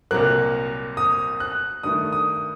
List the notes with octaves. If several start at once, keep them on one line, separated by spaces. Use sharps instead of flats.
C2 A#2 F#3 A#3 F#6
D#6
F#6
G2 D#3 A3 D#6
D#6